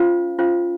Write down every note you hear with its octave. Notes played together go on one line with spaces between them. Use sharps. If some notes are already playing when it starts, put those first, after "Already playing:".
Already playing: C#4 F4 C5 F5
C#4 F4 C5 F5